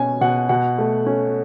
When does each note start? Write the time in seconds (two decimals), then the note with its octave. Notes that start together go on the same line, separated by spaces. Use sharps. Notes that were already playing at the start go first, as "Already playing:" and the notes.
Already playing: B2 C#4 G#5
0.21 B2 F#5
0.49 B2 F#5
0.78 A3
1.06 C#4